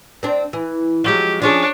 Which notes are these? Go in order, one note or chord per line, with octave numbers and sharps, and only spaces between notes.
C4 D4 C5
E3
F3 F#3 G#3 G4
F3 C#4 D4 G#4 C#5